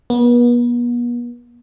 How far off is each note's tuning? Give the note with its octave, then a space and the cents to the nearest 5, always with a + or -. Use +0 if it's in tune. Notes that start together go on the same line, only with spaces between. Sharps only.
B3 -40